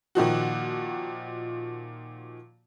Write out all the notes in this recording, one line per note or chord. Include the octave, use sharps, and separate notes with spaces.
A#2 D#3 F3 F#4